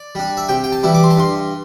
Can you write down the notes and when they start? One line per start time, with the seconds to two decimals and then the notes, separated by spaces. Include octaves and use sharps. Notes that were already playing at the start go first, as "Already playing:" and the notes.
Already playing: D5
0.15 G3 D4
0.37 E5
0.49 C3 G5
0.64 G5
0.72 A5
0.83 E3 G3 E4
0.94 D6
1.03 C6
1.11 A5
1.17 G2 C6